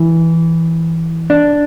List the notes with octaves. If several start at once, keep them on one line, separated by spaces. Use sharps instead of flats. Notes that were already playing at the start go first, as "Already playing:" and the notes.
Already playing: E3
D4